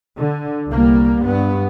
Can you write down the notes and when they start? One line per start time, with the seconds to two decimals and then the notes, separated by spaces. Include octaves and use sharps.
0.17 D3
0.68 C2 G3 A#3
1.24 G2 B3